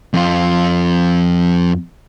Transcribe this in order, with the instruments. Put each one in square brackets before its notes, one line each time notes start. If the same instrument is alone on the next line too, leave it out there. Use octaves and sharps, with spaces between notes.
[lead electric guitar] F2 F4